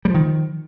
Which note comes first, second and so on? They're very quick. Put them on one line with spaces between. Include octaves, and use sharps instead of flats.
G3 F3 D#3